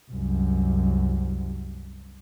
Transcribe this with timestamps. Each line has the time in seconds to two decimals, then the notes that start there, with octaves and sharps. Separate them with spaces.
0.11 C2 F#2